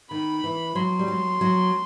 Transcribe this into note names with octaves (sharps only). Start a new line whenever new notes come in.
D#3 B5
E3
F#3 C6
G3
F#3
F#3